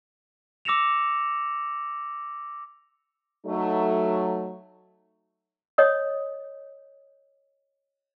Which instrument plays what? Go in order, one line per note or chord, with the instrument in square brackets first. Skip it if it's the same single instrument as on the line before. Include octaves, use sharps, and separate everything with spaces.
[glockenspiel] D6 E6 A#6 C#7 E7 F7
[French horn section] F#3 A3 D#4
[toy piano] C#5 D#5 D#6